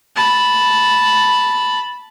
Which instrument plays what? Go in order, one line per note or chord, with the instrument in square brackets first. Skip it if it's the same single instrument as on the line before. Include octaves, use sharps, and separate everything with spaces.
[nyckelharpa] A5 B5